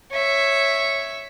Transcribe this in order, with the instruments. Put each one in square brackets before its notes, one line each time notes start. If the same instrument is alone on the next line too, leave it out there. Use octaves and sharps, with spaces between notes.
[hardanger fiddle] C#5 E5